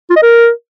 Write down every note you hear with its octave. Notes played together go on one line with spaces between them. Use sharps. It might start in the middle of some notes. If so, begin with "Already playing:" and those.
F4
D#5
A#4